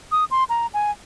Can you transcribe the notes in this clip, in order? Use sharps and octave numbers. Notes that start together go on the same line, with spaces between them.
D#6
C6
A#5
G#5